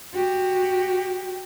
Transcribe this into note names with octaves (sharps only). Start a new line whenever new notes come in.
F#4 G4